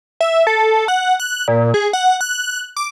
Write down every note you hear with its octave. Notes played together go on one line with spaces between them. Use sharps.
E5
A4
F#5
F#6
A#2
G#4
F#5
F#6
D6